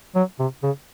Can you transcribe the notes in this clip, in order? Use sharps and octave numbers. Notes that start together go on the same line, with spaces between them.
F#3
C3
C#3